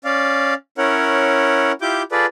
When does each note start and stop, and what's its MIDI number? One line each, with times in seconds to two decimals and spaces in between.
0.05 0.54 61
0.05 0.54 74
0.05 0.54 77
0.78 1.72 61
0.78 1.72 64
0.78 1.72 70
0.78 1.72 73
0.78 1.72 78
1.81 2.03 64
1.81 2.03 65
1.81 2.03 67
1.81 2.03 86
1.81 2.03 91
2.12 2.26 65
2.12 2.26 68
2.12 2.26 69
2.12 2.26 71
2.12 2.26 74